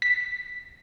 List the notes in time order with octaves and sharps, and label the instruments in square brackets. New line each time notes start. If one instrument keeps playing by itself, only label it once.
[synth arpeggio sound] B6